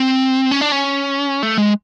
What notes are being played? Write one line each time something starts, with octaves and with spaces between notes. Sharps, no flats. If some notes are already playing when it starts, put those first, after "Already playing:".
Already playing: C4
C#4
D4
C#4
A3
G#3